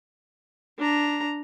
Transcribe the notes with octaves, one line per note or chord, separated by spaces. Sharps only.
D4 A#5